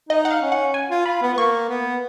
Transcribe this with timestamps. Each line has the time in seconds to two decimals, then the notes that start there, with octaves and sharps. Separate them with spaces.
0.09 D#4 D#5
0.25 F#5
0.31 F5
0.41 C#4
0.52 F#5
0.74 G#5
0.90 F4
1.06 F4 B5
1.22 B3
1.33 B3
1.37 A#3 C#6
1.69 B3